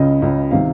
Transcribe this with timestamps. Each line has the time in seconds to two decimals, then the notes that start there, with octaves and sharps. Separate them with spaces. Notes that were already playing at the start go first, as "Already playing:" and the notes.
Already playing: C#2 C#3 D#5
0.22 C#2 C#3
0.51 C3 D#3 F5